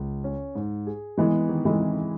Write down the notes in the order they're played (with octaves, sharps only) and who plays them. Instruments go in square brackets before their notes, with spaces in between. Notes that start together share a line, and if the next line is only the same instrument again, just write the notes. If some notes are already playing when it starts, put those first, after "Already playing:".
Already playing: [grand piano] C#2
C#4
G#2
G#4
[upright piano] E3 G#3 [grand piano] B3
[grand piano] D#3
[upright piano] E3 G#3
[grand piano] E4